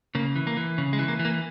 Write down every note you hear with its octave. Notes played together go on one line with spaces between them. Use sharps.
C#3 A#3
E3
A#3
E3
C#3
G#3
E3
A#3
E3
A#3